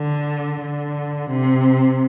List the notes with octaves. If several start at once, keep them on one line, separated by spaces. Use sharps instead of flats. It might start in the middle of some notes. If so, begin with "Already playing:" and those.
Already playing: D3
D3
C3